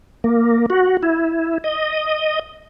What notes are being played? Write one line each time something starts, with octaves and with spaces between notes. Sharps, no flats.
A#3
F#4
E4
D#5